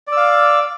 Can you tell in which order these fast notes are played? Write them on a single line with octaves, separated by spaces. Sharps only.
D5 E6 F5